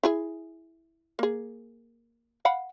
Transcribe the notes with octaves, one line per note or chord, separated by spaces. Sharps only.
E4 G#4 G#5
A#3 G#4
F5 F#5 B5